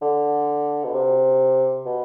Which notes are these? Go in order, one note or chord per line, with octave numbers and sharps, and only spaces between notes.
D3
B2
C3
B2